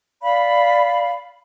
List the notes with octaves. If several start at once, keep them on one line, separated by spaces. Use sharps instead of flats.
D5 F5 B5